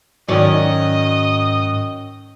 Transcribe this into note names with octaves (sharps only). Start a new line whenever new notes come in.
G#2 D#3 F#3 C#4 D5 D#5